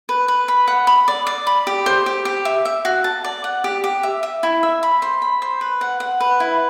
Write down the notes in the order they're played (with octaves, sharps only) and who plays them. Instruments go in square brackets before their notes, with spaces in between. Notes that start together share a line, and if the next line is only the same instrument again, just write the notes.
[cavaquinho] B4
B4
B5
F#5
B5
D5
D5
B5
G4
C5
G4
G4
E5
E5
F#4
A5
D5
F#5
G4
G4
E5
E5
E4
E5
B5
C5
B5
C5
B4
F#5
F#5
B4
E4